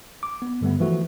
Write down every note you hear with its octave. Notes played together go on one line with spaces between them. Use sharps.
D6
B3
G2 D3 G3 A3 B3
E3 F3 A3 F#4